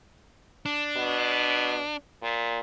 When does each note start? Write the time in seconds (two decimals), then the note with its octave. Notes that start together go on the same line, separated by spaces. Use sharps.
0.66 D4
0.96 B2
2.23 A#2